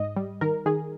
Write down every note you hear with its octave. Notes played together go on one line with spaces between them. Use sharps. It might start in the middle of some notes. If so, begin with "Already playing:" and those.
Already playing: G#2 D#5
G3
D#3 A#4
D#3 G#4